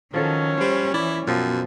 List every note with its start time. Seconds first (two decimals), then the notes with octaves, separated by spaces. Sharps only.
0.14 D#3 F3 F#3 C#4 A4
0.61 G3 C5
0.94 E3 E4 D5
1.27 F#2 B2 F3 C4